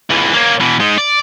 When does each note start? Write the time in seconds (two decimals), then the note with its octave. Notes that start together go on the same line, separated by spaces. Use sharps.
0.10 C#2 E3
0.34 A#3 C#4
0.61 B2 E3
0.80 G#3 D#4
0.98 D5